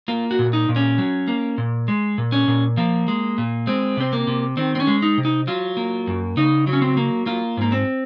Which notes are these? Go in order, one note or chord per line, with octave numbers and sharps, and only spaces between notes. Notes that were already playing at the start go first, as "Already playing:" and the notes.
A#3 F4
F#4
A#2
D#4
A#2
C#4
F#3
A#3
A#2
G#3
A#2
C#4
A#2
F3 A#3
G#3
A#2
G#3 C4
C3 C4
A#3
C3
D#3 C4
C4
C#4
G#3
D#4
C3
D#4
F#3 F4
A#3
F#2
C#3 D#4
F#3
C#4
C4
A#3
A#3 F4
G#2 A#3
C4